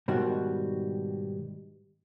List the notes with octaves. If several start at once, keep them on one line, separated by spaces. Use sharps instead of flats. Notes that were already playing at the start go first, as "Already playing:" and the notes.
G#2 B2 D#3 G3 F#4